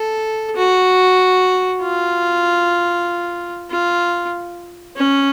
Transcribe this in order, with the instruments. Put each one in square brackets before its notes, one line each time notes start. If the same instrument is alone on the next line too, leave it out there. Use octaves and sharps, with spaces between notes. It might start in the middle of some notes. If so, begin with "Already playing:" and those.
Already playing: [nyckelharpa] A4
F#4
F4
F4
C#4